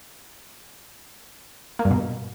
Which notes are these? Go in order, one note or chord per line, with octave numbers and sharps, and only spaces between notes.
A#3
G2
B2